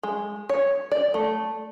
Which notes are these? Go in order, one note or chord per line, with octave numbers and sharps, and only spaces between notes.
G#3
C#5
D5
A3